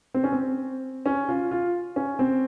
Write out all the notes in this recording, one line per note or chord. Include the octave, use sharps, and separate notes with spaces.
C4
C#4
C4
C#4
F4
F4
C#4
C4